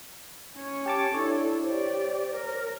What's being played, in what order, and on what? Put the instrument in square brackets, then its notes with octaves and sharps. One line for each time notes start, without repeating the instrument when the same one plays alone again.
[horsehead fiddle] C#4 C#5
[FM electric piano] G4 A5 D6
[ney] D4 [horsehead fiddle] E4 A4 [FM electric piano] C#5
[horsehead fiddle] G4 D5 [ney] C5
[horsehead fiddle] A#4